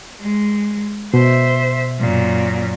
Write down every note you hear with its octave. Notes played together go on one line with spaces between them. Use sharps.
G#3
B2 C5 E5
F#2 A#2